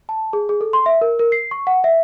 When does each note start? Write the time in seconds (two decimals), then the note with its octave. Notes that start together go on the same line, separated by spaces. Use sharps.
0.09 A5
0.33 G#4
0.49 G#4
0.61 A4
0.73 C6
0.86 E5
1.01 A#4
1.19 A#4
1.32 C7
1.51 C#6
1.67 F#5
1.84 E5